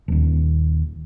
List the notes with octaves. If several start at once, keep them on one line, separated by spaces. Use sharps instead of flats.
D#1 D#2